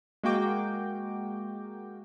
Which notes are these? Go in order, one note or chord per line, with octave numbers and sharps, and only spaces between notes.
G#3 A#3 F#4 G5 D6